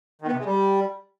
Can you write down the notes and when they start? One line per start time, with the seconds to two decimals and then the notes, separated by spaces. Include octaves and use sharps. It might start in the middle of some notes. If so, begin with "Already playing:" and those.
0.22 D#3
0.27 B3
0.33 C3
0.39 G#3
0.45 G3